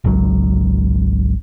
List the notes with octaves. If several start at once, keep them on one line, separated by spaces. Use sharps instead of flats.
G#1 C#2 F#3